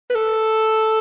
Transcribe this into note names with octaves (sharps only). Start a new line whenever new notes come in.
B4
A4